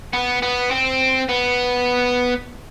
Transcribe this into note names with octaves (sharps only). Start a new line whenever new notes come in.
B3
B3
C4
B3